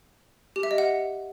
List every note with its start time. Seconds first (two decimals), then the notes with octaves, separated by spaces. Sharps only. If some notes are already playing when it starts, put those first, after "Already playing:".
0.56 G4
0.63 E5
0.71 D#5
0.78 F#5